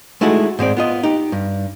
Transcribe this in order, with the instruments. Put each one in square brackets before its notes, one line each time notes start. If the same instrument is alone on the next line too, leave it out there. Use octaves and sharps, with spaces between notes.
[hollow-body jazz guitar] G#3 A3 D#4 E4 F#4 G#4
G#2 G#3 C4 D5
B3 F4 D#5
D#4 G4
G2